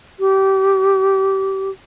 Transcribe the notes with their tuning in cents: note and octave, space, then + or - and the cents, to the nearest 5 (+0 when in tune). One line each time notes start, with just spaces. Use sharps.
G4 -25